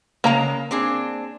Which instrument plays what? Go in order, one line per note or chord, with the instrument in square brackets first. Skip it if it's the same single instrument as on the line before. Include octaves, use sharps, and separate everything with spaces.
[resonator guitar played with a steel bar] C#3 G#3 [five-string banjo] A#3 A#5
[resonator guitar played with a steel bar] C4 D4 G#4